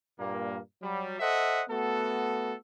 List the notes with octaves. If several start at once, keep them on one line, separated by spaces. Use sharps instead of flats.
G2 A#2 A#3
F#3 G3
A4 C5 D#5 E5 F#5
A3 B3 F#4 A4